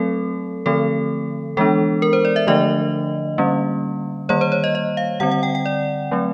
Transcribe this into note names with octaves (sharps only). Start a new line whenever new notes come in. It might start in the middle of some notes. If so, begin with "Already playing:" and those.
Already playing: F#3 A3 C4 A4
D3 F3 A3 C4 A4
E3 G#3 B3 D4 A4
A#4
C5
D5
E5
D3 F3 A3 D4 D#5
D3 G3 A#3 C#4
D#3 G3 A#3 C#5
C5
C#5
D#5
D#5
F5
D3 G3 C4 F#5
F#5
G5
G5
D5
F#3 A3 C4